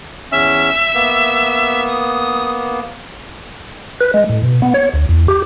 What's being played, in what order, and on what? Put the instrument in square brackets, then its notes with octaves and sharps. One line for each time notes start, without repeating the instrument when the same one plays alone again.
[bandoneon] E2 C#4 [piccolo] E5
[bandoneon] A#3 B3
[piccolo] D#6
[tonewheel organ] B4
G#3
A2
B2
B3
C#5
D2
E2
G4